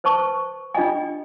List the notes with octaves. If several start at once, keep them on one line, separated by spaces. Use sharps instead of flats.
B4 C5 A5 C#6
D4 F4 D#5 G5 G#5